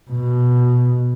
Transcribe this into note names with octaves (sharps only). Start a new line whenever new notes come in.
B2